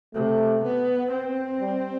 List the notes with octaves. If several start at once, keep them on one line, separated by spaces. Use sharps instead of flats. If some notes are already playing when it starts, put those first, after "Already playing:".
C3 A3
B3
C4
G3